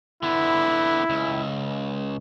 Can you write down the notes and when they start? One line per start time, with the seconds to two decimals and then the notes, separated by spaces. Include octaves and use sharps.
0.23 D3 B3 E4
1.10 C#2